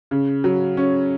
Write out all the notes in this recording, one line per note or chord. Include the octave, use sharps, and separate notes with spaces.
C#3
F#3
C#4